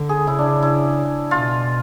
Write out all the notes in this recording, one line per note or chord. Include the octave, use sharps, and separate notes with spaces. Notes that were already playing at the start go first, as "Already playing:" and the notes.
Already playing: D3
G#4
C#3 E4
D4
E4
B2 F4